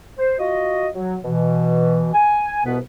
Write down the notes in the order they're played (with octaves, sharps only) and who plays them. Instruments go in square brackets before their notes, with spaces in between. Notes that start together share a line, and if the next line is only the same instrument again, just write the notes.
[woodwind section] C5
F4 F#4 D#5
F#3
B2 E3
G#5
C2 B2 B3 B4